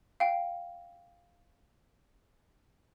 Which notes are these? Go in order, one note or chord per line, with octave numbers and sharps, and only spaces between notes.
F5 G5